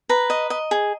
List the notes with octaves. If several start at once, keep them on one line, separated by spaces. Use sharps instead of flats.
B4 A#5
D#5
D#5
G#4